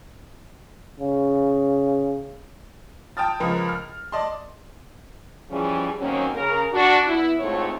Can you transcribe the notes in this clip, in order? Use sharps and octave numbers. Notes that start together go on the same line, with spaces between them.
C#3
G5 A5 D#6 F6 A6
C#2 F3 A#4 B4
F6
D5 D#5 A5 C6
E3 F3 G3 C#4 G#4
D#3 F#3 A#3 C4 C#4
C#3 A#4
D4 F#4
B3 E4
D2 G#2 A3 C4 F4 C#5